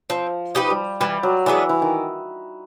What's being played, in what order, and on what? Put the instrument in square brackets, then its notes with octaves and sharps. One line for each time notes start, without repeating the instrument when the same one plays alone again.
[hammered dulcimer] F3 [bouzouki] C4
[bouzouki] D#4 G4 B4
[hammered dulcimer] G3
[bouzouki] E3 [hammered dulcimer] G3
[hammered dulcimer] F#3
[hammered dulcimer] E3 [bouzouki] G#3 B3 D4
[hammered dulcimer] E3
D#3